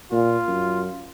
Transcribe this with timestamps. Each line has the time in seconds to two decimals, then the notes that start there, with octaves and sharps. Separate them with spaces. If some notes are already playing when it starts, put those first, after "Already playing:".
0.12 A#2 F4
0.48 F#2